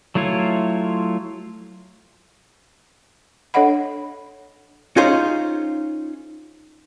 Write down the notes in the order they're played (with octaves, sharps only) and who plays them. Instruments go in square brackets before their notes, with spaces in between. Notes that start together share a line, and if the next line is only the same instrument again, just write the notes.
[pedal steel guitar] F#3 A3 E4 F4 C#5
[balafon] D4 A4 C#5 D#5 F#5 B5
[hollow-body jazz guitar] C#4 D#4 F4 G#4 C5 C#5